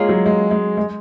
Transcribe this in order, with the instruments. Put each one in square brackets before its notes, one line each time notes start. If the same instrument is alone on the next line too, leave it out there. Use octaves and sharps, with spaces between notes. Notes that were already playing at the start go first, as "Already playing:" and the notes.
Already playing: [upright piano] G#3 [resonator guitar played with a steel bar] A#3 F4 G#4 C#5
[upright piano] F#3
G#3
G#3
G#3